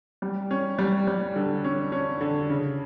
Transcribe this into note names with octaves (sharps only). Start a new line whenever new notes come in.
G3
C#4
G3
G3
D3
C#4
C#4
D3
C#3